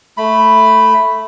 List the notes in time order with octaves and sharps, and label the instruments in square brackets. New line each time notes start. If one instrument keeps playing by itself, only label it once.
[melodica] A3 B5